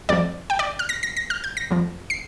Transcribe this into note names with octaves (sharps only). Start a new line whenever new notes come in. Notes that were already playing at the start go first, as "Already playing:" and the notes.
F2 F3 D5
G5
D5
F6
A#6
A#6
A#6
F6
G6
A#6
F2 F3
C7